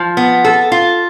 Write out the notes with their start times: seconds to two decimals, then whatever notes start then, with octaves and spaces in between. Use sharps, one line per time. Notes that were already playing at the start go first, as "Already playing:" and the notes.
Already playing: F3
0.17 B3
0.45 A4
0.72 F4